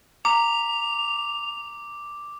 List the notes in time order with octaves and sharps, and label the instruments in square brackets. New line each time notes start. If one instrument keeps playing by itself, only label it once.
[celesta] A#5 [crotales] D6 [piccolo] F7